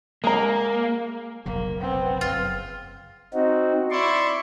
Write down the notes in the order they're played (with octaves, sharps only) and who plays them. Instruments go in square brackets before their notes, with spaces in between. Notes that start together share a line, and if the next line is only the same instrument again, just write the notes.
[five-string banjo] G#3 A#5 [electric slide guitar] A#3
[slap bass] F1 B1 C#3 [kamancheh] A#3
[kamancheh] B3 C4
[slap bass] F#1 C#3 [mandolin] F4
[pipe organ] C4 D#4 F#4
[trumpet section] E4 D5 [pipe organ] C6 C#6